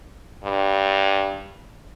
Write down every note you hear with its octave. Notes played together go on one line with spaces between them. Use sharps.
G2